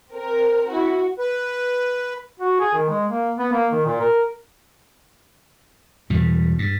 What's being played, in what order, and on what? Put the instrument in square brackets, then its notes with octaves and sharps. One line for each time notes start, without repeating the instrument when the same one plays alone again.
[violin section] C4 A#4
[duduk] E4 [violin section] F#4
[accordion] B4
[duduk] F#4
G#4
D#3
G#3
A#3
B3
A#3
D#3
A#2
A#4
[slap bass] E2 B2 G3
G2